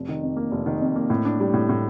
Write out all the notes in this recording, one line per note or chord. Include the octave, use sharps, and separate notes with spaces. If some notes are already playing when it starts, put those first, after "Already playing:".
Already playing: F1
D#3
F2
A#3
F1
D#3
F2
A#3
A2
D4
G3
A2
A2